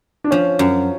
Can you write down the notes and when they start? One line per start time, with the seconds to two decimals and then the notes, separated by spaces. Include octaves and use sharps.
0.24 D4
0.31 F3 C#4
0.59 F#2